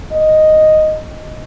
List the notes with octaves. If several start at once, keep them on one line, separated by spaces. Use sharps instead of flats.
D#5